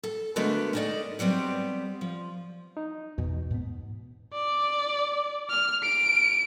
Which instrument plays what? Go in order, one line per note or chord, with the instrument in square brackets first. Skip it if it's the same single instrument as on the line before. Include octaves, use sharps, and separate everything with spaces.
[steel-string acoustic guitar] A4
D3 G#3 A3 B3 F#4 A#4
C#4 D#4 E4 A4 D5 D#5
F#3 G3 B3 C4
F3
[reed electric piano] D#4
[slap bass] E2 [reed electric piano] B2
[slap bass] G#2 B3
[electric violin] D5
F6
D7